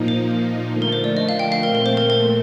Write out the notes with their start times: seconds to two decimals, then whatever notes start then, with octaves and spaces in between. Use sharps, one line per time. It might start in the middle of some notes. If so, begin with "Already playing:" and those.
Already playing: A#2 F3 A#3 D#4
0.08 C5
0.70 D3 F3 A3
0.82 A#4
0.92 C5
1.04 D5
1.17 D#5
1.29 F5
1.39 G5
1.52 F5
1.63 A#2 A3 C4 A#4
1.75 A#4
1.86 C5
1.97 A#4
2.10 A#4